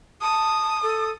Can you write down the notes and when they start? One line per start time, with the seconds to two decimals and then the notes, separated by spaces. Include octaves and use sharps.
0.22 A5 D#6
0.83 A4